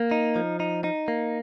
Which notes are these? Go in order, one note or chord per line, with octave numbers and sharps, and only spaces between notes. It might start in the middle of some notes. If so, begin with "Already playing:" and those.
Already playing: A#3
D#4
F3
D#4
D#4
A#3